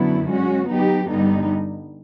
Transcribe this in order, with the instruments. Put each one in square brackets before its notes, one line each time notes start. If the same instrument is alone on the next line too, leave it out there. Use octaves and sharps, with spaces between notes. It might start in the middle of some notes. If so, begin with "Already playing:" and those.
Already playing: [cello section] F#2 D3 F#3 B3 E4
G#3 C#4 F#4
F#3 B3 D#4 G4
G2 D3 G3 B3 D#4